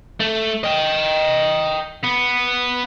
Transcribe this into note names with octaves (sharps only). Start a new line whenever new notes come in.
A3
D#5 G5
B3